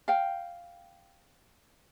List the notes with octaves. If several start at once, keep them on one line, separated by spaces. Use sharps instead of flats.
F5 G5